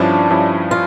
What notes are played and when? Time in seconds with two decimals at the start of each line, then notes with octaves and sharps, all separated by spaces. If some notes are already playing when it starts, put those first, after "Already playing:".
Already playing: G2 F3 C#4 D4 E4
0.30 G2 F3 C#4 E4
0.71 F4